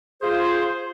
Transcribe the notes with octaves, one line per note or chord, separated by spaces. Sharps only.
F4 G#4 C5